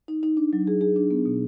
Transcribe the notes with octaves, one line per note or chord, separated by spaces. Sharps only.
D#4
D#4
D4
F#3
G#4
G#4
D4
B3
B2